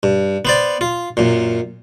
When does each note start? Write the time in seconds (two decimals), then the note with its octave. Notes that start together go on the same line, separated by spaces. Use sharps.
0.03 G2
0.45 B3 C5 D5
0.81 F4
1.17 F#2 A#2